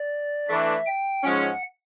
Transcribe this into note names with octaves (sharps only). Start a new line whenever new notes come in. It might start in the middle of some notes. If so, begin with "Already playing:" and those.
Already playing: D5
E3 A3 D4 E5
G5
G#2 F3 G#3 C#4 F#5